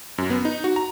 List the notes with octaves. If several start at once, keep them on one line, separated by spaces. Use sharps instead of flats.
F#2
B3
D#4
F#4
A#5